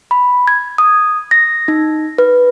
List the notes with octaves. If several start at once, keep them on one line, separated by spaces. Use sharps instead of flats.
B5
G#6
D#6
A#6
D#4
B4